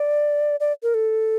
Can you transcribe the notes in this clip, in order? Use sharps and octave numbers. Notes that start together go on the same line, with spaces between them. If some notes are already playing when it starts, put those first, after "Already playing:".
Already playing: D5
D5
A#4
A4